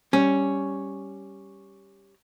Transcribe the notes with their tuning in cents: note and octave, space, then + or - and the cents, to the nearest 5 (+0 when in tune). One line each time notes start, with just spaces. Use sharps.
G3 +0 C#4 +0